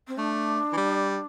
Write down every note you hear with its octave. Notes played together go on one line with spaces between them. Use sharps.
C4
A3 D4
E3
G3